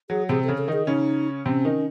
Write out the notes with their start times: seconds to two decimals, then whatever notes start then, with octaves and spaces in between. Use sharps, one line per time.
0.09 F#3 G#4
0.29 C3 C4 G#4
0.44 C#3 C#4 A4
0.58 A4
0.68 D#3 D#4 G#4
0.87 C#3 C#4 D#4
1.46 C3 C4 C#4
1.65 D#3 D#4